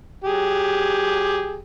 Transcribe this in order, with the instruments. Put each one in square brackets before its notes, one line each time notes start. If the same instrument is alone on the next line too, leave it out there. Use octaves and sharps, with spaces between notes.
[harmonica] F#3 G4 G#4